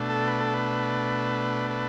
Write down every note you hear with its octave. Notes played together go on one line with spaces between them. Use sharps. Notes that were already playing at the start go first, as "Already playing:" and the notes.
Already playing: B2 A3 D4
A4
B4
A4
B4
B4